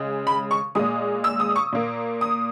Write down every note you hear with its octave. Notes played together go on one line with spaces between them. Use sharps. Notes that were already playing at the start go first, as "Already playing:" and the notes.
Already playing: C#3 G#3
B5
C#6
A#2 G#3 D#6
E6
D#6
C#6
A#2 A#3
D#6